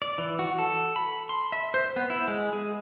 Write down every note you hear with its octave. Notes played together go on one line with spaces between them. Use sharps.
D5
E3
F#4
A4
B5
C6
E5
C5
B3
E4
G#3
G#4